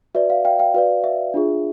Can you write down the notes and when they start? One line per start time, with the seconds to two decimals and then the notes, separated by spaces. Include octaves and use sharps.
0.15 F#4 B4 D5 E5
0.30 F5
0.45 F5 G5
0.59 F5 G5
0.74 F#4 B4 D5 F5
1.04 E5
1.34 D4 F4 G#4